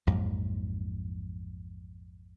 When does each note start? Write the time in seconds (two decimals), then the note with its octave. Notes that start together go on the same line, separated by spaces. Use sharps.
0.07 A#1 F2 G#2 F#3